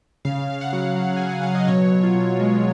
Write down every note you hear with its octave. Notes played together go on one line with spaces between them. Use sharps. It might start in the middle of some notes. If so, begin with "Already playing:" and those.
C#3 F5
C#3 F5
F#5
F#3
F#3
F#3 G#5
F#5
F#3 F5
D#5
B2 C#5
B2
F4
B2
G#3